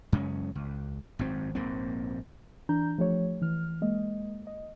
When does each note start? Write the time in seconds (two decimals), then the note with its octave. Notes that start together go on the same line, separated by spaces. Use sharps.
0.12 F#2 C#3 G#3 C#4
0.55 C#2
1.19 G#1 F#2 C4
1.55 A#1 G#2 A#3 C4
2.69 E3 D4 A#5 G6
2.98 F3 A3 G4 C#5
3.42 E3 F6
3.82 G#3 A#3 D#5
4.47 D#5